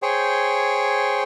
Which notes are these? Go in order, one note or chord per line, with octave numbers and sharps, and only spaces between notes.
G#4 C5 C#5 G5